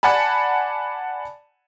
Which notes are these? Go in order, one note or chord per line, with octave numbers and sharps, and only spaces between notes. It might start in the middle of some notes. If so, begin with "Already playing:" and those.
D5 F#5 G#5 A5 B5